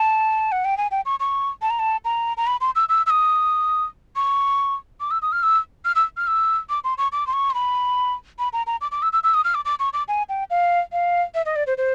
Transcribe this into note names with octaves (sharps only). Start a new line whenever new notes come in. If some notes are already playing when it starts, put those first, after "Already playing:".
Already playing: A5
F#5
G5
G#5
G5
C#6
C#6
A5
A#5
A5
A#5
A#5
B5
C6
E6
E6
E6
D#6
C#6
D6
E6
D#6
F6
E6
F6
E6
F6
E6
D6
C6
C#6
D6
C6
C#6
C6
B5
B5
A#5
A#5
D6
D6
E6
E6
E6
D#6
F6
D6
D6
C#6
D6
G#5
G5
F5
F5
E5
D#5
D5
C5
C5